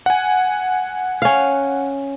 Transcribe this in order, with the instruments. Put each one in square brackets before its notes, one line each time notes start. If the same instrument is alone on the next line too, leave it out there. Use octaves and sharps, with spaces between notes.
[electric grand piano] F#5 G#5
[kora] C#4 F5